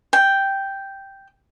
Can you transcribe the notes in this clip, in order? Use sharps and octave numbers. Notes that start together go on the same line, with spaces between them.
G5